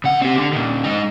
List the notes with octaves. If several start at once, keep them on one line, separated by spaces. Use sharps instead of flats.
C#3 F#5
C4 G4
D3
A#2 D#3
G#3 D#4